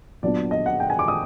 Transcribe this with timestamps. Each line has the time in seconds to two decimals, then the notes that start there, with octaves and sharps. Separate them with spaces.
0.23 A#2 F#3 B3 D4 D5
0.51 D#5
0.66 F#5
0.80 G5
0.90 G#5
0.99 D6
1.08 D#6